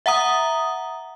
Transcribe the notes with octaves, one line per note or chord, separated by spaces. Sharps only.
E5 F#5 A#5 D#6